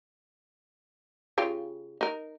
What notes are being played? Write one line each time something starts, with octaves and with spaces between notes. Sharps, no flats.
C#3 F4 G4
D#4 A#4